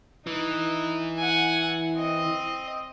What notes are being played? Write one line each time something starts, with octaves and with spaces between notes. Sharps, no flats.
E3 D#4
F#5 G#5
C4 D#5